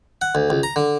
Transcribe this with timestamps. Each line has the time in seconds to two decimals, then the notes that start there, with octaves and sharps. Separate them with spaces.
0.22 F#5
0.35 D2
0.50 C#2
0.63 A#5
0.76 D3